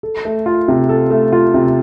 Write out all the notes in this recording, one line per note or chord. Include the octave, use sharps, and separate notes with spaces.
A4
A3
F4
C3
A4
A3
F4
C3